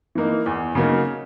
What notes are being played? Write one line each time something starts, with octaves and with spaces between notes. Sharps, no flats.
E3 A#3 D#4
E2
C#3 F#3 A#3 D#4